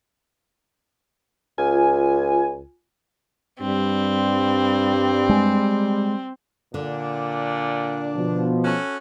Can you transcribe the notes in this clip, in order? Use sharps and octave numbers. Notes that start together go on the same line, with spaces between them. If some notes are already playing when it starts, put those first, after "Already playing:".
C#2 F4 G#5
G2 G3 C4
G#3
A#2 D3 D4
B2 F3
C#4 F#4 A4